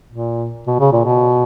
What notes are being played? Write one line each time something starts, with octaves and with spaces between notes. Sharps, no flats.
A#2
B2
C#3
A#2
B2